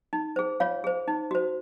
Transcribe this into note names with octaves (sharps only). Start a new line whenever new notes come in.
D#4
G#4 C5
F4 C#5 F5
G#4 C5
D#4
F#4 C5